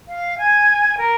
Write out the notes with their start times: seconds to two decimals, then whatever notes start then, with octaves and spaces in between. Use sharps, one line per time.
0.08 F5
0.38 G#5
0.98 A#4